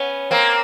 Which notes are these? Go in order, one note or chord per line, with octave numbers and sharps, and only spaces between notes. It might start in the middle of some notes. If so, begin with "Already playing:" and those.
Already playing: B3 C#4
A#3 C4